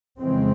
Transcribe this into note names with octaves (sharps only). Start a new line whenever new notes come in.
F2 C#3 E3 G#3 C4